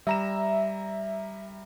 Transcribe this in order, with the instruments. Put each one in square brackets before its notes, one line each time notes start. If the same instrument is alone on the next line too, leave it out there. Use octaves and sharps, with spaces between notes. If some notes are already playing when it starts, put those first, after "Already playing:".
[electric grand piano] G3 A#5 E7 [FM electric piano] E5